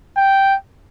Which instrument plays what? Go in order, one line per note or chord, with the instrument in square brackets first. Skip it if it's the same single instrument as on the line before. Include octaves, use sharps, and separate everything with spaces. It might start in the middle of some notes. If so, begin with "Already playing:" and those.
[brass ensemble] G5